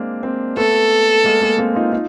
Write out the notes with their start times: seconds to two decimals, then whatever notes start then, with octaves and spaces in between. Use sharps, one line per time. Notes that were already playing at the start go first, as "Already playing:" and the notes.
Already playing: G#3 A#3 C4 D4
0.23 A#3 C4
0.57 A3 B3 A4
1.24 G#3 A#3
1.41 G#3 A#3
1.58 A#3 C4
1.75 D#4 F4
1.92 D#4 F4